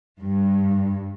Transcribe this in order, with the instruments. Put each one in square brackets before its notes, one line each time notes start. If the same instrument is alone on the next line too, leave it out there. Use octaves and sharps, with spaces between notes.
[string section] G2